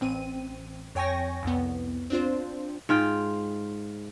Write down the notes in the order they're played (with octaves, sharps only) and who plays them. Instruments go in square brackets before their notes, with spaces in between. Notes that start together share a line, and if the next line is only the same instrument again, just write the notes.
[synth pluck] A1 C4 D#7
F2 C#5 G5 G#5 C#6 A#6
C2 F2 B3
C4 D4 F4 C5
[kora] G#2 F4 G5